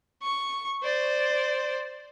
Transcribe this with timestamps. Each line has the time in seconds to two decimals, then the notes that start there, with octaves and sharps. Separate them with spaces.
0.23 C#6
0.83 C5 D5